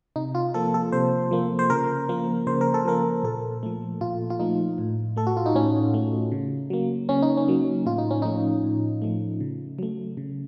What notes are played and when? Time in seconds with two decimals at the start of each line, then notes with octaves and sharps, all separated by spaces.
0.16 C3 D#4
0.35 F4
0.54 F3 A#3 A4
0.74 A4
0.92 C3 C5
1.31 F3 A#3
1.59 C5
1.70 C#3 A#4
2.09 F3 A#3
2.47 C#3 C5
2.61 A#4
2.74 A4
2.85 F3 A#3 A#4
3.23 A#2 A4
3.63 F3 A3
4.01 A#2 F4
4.30 F4
4.39 F3 A3 D#4
4.78 A2
5.16 A3 A4
5.27 F#4
5.37 F4
5.46 D#4
5.55 A2 C#4
5.94 A3
6.32 C#3
6.70 F#3 A#3
7.09 C#3 C#4
7.22 D#4
7.37 C#4
7.48 F#3 A#3
7.86 A2 F4
7.98 D#4
8.11 C#4
8.22 F3 A3 D#4
8.64 A2
9.02 F3 A3
9.40 C#3
9.79 F#3 A3
10.17 C#3